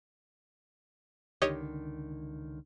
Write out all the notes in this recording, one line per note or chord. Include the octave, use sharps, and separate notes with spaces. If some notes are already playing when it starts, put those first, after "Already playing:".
C#2 D3 D#3 G4 C#5 D#5